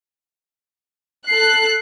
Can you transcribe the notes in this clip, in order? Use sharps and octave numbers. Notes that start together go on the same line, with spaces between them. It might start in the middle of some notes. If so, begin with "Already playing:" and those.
A4 F#6 C7